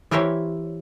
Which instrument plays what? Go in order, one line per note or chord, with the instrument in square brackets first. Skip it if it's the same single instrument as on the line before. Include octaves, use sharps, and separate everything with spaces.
[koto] E3 E4 G4 A#4 C5 C#5